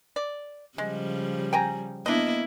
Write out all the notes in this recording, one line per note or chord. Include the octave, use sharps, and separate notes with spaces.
D5
C#3 F3 G3 G#3
G5 G#5 A#5
A#3 B3 D4 E4 D#5